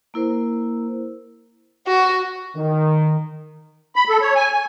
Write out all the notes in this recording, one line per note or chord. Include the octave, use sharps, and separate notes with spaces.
A#3 E4 A#4 C5
F#4
D#3
B5
A4
C#5
G#5
G#5